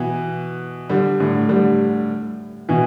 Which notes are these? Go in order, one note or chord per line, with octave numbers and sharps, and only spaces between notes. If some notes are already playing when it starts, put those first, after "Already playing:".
Already playing: B2 E3
D3 G3
A2 D3
D3 G3
B2 E3